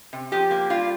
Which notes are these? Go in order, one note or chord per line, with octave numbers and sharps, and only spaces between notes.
C3
F3 G4
A#3
G3 F4